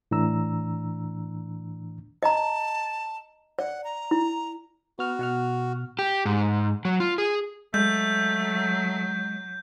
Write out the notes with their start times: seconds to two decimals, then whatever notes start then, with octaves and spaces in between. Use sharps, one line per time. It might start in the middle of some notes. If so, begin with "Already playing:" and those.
0.11 A2 E3 D4 A#5 E6
2.23 D#5 A5 A#5
3.59 D5 F#5
3.84 A#5
4.11 E4
4.99 B3 F#4 F6
5.19 B2 F#5 F6
5.99 G4
6.26 G#2
6.85 F#3
7.00 F4
7.18 G#4
7.74 F#3 G#3 A3 G6